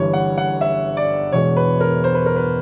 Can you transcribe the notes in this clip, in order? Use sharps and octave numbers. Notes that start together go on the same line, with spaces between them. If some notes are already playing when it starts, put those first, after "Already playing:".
Already playing: G1 G2 E3 G3 C#5
F#5
F#5
E5
D5
E1 E2 B2 G#3 C#5
B4
A#4
C5
B4
A#4
B4